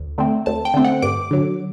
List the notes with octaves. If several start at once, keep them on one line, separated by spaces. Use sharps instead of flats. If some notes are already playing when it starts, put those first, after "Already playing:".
Already playing: D2
D3 A3 C4
D2 A5
G5
D3 A3 C4
F#5
G2 D6
D3 F#3